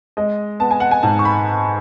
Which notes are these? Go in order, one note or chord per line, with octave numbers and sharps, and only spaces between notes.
G#3 D#5
B3 A5
G#5
F#5
G#5
G#2 A5
C#6
B5